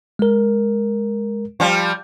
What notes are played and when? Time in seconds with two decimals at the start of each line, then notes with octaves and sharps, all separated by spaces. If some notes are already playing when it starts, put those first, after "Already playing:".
0.19 G#3 A#4
1.60 F3 G3